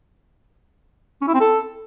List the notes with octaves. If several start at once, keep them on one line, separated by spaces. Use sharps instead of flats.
C#4
E4
C4
A4